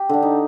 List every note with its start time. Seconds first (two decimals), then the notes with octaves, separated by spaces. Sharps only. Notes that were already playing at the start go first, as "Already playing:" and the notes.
Already playing: G4
0.09 D3 D4
0.23 D#4